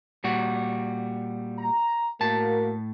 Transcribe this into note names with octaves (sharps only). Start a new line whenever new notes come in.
A#2 G3 F#4
A#5
A2 A#3 F#4 A#4 A5